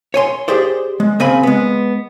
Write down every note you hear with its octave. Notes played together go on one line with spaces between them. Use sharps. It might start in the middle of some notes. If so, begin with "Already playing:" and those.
C#5 G#5 C6
G4 G#4 C5 D5
G#3
C#3 C4 G#5 B5
G#3 B3